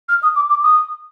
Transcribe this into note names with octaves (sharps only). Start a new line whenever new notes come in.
F6
D#6
D6
D6
D#6